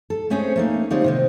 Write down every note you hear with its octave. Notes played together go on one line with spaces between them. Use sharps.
A4
A3 C4 C#4 G#4 C5 C#5
A3 A#3 D#4
D3 G3 C4 D#4 F4 C#5
C3 D#3 C4